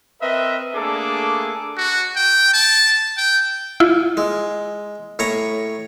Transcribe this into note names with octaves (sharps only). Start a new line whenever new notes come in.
C4 A#4 B4 D#5 E5
A3 A#3 D4 G#4 A4 D6
F#4
G5
A5
G5
E4 F4
G#3
A2 C#5 A#5